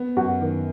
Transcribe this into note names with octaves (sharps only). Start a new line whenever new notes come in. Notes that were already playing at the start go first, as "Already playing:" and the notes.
Already playing: B3
F#2 F#4
D#3